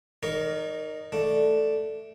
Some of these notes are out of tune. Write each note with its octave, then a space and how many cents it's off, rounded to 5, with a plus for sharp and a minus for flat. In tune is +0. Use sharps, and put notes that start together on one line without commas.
D#4 -15 A#4 +0 C#5 +45
A3 +0 D4 +0